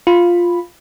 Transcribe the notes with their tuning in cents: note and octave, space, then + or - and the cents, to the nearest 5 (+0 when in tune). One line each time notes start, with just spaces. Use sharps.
F4 +0 B5 +0